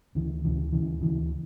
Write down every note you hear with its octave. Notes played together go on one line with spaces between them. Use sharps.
D2 C#3 E3
D2 C#3 E3
D2 C#3 E3
D2 C#3 E3